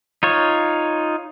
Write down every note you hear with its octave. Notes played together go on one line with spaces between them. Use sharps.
D#4 F4 C#5